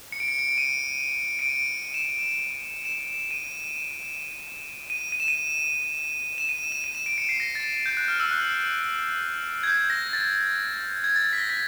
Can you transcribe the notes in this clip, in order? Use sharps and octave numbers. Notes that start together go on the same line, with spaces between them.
C#7
D7
C#7
C#7
D7
D#7
D7
D#7
E7
E7
D#7
E7
D#7
D#7
E7
D#7
E7
D#7
E7
D#7
E7
D7
C#7
C7
A#6
A6
G6
F#6
F6
E6
F#6
G#6
G6
A#6
A6
G#6
A6
B6
A#6
B6